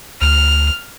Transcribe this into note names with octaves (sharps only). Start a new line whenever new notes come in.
D2 F6